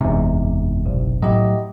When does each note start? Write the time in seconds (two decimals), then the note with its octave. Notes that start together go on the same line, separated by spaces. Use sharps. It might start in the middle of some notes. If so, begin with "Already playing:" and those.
0.01 F#1 E2 G#2 C3
0.86 B1
1.22 A2 F#3 G4 D#5